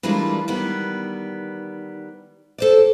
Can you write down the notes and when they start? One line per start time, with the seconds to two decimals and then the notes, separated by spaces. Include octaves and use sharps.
0.03 E3 G3 G#3 A#3 D4 F4
0.48 D#3 G3 B3
2.58 A4 C5 D5